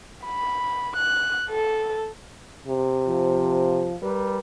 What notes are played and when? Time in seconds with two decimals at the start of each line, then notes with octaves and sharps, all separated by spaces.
0.25 B5
0.97 F#6
1.50 A4
2.67 C3
3.07 F3
4.02 G3 A#4 B4